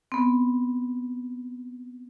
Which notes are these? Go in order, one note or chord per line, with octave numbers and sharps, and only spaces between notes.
B3 C4